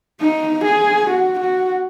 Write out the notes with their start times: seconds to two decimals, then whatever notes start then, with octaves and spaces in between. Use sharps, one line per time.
0.20 D#4
0.64 G#4
1.10 F#4
1.39 F#4